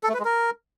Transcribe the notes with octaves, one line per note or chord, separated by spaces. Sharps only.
A4
A3
B4
G#3
A#4